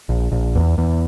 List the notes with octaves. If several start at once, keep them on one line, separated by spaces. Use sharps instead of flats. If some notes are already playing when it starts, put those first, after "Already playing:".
A#1
A#1
E2
E2